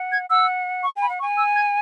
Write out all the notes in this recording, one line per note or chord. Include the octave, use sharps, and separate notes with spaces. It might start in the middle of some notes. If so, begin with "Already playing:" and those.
Already playing: F#5
G#6
F#5 E6
C#6
G#5
B5
F#5
C#6
G#5
E6
G#6